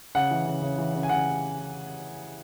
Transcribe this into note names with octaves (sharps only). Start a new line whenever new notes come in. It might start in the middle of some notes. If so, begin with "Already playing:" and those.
C#3 F#5
E3
C#3
C#3
E3
C#3
G#5
C#3 F#5